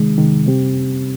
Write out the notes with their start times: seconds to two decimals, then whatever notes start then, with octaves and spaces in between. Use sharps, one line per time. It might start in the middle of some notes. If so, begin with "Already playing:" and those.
Already playing: C3 D#3 G#3
0.18 C3 D#3 G#3
0.47 C3 G3 C4 G4